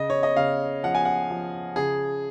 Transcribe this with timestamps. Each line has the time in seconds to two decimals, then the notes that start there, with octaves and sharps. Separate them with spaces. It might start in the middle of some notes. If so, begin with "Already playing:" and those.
Already playing: C#3 D#5
0.10 C#5
0.23 D#5
0.36 C#3 F5
0.83 F3 F#5
0.95 G#5
1.05 F#5
1.30 F3
1.76 C#3 G#4